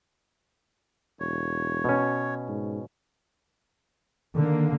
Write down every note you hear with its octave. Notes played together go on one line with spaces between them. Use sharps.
E1 C#5
B2 C#4
G#2
D3 D#3 A#3